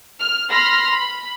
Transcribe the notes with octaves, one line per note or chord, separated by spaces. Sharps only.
F6
B5 C6 F6 A#6
B5